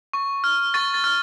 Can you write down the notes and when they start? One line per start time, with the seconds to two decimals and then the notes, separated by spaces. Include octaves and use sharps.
0.13 C#6
0.44 F6
0.74 C#6 A6
0.94 A6
1.04 F6